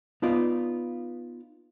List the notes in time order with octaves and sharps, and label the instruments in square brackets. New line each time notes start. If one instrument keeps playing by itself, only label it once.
[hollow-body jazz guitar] B3 D#4 F4 D5